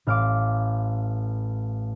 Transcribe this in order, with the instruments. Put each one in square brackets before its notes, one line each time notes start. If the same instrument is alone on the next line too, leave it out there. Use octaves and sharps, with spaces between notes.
[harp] A1 F5 D6